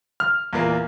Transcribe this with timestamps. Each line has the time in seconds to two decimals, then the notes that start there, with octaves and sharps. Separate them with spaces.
0.20 F6
0.53 E2 A#2 A#3